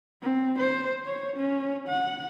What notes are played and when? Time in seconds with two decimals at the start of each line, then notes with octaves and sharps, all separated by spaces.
0.22 C4
0.58 C5
1.06 C#5
1.36 C#4
1.88 F#5